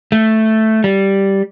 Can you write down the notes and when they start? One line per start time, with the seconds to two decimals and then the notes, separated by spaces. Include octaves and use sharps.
0.12 A3
0.84 G3